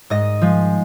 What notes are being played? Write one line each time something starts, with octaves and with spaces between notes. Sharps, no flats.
G#2 D#5
F3 G#3